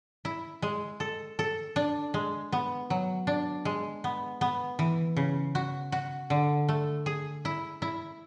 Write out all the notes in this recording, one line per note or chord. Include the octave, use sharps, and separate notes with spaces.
E4
G#3
A4
A4
D4
G#3
B3
F#3
D4
G#3
B3
B3
E3
C#3
F#4
F#4
D3
A3
G#4
E4
E4